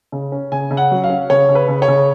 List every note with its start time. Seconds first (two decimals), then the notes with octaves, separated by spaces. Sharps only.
0.12 C#3
0.32 C#4
0.52 C#3 G#5
0.71 C#3
0.77 F#5
0.91 F#3
1.04 F5
1.10 C#4
1.30 C#3 C#5
1.49 C#3
1.55 B4
1.68 C#3
1.82 C#5
1.88 C#3